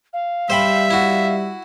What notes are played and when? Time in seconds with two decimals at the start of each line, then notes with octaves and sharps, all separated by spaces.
0.13 F5
0.50 G3 C5 E5 G5 B5
0.90 E4 F#4